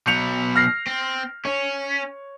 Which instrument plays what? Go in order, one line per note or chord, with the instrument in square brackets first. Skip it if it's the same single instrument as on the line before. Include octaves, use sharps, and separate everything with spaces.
[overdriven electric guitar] B2 F#3 [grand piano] G6 C#7 F7
[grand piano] F6 A#6 C7
[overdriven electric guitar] C4
[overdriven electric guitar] C#4 [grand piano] C#5